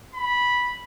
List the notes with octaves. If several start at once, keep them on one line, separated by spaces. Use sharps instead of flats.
B5